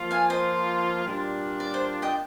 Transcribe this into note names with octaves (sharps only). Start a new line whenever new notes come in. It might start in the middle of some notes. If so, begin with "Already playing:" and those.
Already playing: F3 A#3 F4
F5 G#5
C5 D#5
A#2 G3 D4 F4
D5
C5
D#5 G5